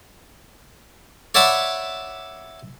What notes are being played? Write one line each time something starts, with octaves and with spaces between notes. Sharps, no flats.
C#5 D5 E5 F#5 A5 B5